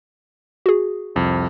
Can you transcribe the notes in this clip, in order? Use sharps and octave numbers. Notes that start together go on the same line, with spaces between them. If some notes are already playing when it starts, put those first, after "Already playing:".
F#4 G#4
C2 F2